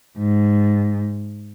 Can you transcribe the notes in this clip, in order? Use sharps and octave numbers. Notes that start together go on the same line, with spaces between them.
G#2